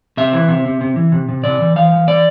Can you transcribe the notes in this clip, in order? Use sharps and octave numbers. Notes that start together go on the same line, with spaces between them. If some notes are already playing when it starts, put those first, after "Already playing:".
C3 E5
E3
C3
C3
C3
E3
C3
C3
C3 D5
E3
E3 F5
E3
E3 D5